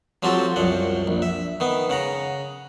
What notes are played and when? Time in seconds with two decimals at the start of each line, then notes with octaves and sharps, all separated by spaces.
0.23 F3 F#3 C4 F#4 G4 A4
0.56 C2 F#2 F3 F#5
1.08 A#1
1.22 E5
1.60 D#3 B3
1.90 C#3 F#5 A#5